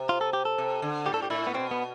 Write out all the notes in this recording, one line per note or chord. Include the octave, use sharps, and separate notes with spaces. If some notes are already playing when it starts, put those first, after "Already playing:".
Already playing: C3
F4
A4
G4
A4
C3
D3
A2 G4
A4
G4
A2 E4
B3
B2 C4
B3